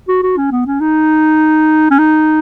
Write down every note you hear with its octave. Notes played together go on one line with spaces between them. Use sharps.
F#4
F#4
C#4
B3
C#4
D#4
C#4
D#4